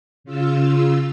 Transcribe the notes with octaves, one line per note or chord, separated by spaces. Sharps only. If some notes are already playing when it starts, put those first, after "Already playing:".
C#3 F4 E6